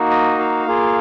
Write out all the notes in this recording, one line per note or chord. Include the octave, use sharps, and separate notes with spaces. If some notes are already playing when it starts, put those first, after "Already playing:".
Already playing: A#3 D#4 F#4
D#5
F5
A#3 F4 G#4